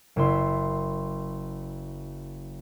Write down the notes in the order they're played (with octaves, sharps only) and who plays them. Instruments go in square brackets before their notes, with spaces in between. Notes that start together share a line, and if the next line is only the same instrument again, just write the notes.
[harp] F#1 E4 E5 C6